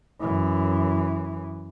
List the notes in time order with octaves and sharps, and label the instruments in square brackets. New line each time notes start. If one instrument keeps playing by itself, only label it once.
[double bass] F#2 E3